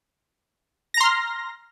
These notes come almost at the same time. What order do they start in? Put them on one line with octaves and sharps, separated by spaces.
A#6 A#5 C6 F6